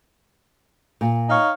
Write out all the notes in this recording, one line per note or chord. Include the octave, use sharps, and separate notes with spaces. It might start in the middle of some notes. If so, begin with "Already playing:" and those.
A#2
D#4 C#5 F5